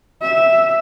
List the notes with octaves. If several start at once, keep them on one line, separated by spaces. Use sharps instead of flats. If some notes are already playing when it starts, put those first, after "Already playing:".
E5